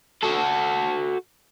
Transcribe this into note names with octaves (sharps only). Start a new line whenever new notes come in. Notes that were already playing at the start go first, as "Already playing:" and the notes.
F#4 A4